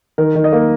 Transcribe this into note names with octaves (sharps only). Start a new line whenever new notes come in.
D#3 A#4
D#3
D#5
A#3